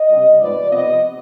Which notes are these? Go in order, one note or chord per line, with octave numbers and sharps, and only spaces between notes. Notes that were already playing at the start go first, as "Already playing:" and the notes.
Already playing: D#5
C3 G3 D4
G#2 F3 B3 D5
C3 F3 B3 D#5